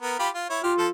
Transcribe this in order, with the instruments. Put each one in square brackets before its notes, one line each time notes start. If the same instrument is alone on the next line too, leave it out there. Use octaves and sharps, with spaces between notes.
[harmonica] B3 A#4
F4 G4 B5
F4
E4 C#5
[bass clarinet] F4 [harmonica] G4 F6
[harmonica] F3 A4